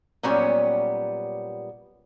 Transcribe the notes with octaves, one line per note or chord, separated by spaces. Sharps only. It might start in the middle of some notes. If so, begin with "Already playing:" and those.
A#2 F#3 G3 B3 C#4 C#5